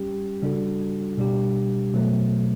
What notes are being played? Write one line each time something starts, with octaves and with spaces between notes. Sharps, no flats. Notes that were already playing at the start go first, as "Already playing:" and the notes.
Already playing: G3 C#4 G4
C#3 G3 D4 F#4 A4
B2 G3 D4 G4
B2 F#3 A3